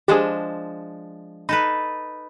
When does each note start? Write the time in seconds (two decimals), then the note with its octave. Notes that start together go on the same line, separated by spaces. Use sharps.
0.08 F3 G#3 D4 G4 G#4
1.49 D#4 A4 B4 B5